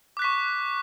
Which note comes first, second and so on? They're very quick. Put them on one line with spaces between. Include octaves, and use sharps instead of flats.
D6 F#6 B6 C#6